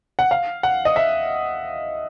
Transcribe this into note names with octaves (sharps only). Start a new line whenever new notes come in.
F#5
F5
F#5
D#5
E5